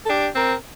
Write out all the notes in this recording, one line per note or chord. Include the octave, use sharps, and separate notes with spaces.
A4
D4 G4
C4 A#4